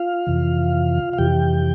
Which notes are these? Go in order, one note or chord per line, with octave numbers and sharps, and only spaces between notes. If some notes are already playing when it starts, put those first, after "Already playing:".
Already playing: F4 F5
F2 C3 E3
F5
F2 C3 E3 G4 G5